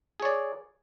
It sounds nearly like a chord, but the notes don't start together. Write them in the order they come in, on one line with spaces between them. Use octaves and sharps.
G#4 C#5 D5